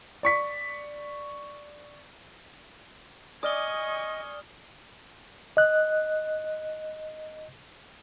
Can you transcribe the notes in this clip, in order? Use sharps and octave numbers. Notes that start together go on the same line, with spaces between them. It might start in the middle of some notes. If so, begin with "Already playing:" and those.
D5 C#6 B6
D5 D#5 G#5 C#6 D#6 F6 G7
D#5 F#6